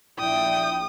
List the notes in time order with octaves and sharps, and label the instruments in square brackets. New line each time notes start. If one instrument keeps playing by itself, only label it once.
[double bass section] A#1 [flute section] E4 D5 [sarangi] G5 [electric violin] D#6